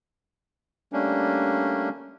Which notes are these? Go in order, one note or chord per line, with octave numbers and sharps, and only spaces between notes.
G3 A3 A#3 C#4 D4